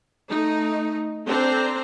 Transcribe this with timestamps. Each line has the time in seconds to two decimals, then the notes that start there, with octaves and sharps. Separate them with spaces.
0.30 A3 D#4
1.27 C4 D4 A4 C5 A#5